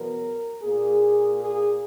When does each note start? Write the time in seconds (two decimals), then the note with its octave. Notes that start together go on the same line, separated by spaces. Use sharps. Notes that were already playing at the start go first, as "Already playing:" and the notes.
Already playing: E2 B2 F#3 B3 A#4
0.63 A#2 A#3 G#4
1.39 G#4